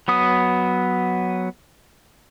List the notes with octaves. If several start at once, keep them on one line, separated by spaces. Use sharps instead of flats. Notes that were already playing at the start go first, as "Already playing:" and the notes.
F#3 B3 D#6